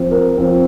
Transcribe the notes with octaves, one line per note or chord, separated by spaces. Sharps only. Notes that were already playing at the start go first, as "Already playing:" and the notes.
Already playing: F3 C4
A#4
F3 C4